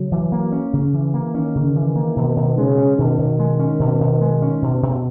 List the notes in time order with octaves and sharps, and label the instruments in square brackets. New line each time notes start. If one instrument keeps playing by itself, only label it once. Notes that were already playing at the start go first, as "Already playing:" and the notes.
Already playing: [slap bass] C#3 [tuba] F#3
[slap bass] E3
A#3
C#4
C#3
E3
A#3
[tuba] D#3 [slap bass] C#4
[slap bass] C#3
E3
A#3
[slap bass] B2 [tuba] D#3
[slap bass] B2
[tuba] C#3 [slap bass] G#3
[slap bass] C#4
[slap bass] B2 [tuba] D#3
[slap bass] B2
G#3
C#4
B2
B2
G#3
C#4
B2
B2